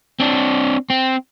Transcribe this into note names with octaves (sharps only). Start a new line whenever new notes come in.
C4 D4
C4